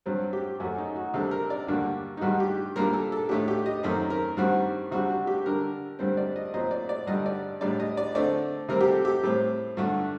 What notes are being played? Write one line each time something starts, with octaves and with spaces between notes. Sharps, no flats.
G2 F#3 C4
G4
F#2 F#3 A3 F#4
D#4
F#4
C3 G3 D4 A4
A#4
D5
G2 D3 G3 A#3 D4 F#4
D#4
G2 D#3 G3 D4 F#4
G4
A#2 G3 A#3 D4 A#4
A4
A4
A2 A3 D4 G4
G4
D#5
F#2 D#3 A3 C4 C5
A#4
G2 D#3 G3 C4 F#4
C3 G3 D4 F#4
F#4
G4
D3 G3 D4 A#4
G2 D3 G3 C4 C5
D5
D#5
A#2 F#3 C4 D#5
D5
D5
G2 D3 G3 D#5
D5
A2 G3 D4 D5
D#5
D5
D3 A3 C4 D5
C3 G3 C4 A#4
G4
A4
G4
A2 G3 C4
G2 D3 A3 D4 F#4